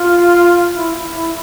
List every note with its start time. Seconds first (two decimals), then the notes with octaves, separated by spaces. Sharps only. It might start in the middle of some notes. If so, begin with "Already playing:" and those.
Already playing: F4
0.75 E4
1.15 E4